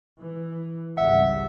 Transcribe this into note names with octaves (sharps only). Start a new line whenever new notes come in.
E3
G#1 C#2 G3 E5 F#5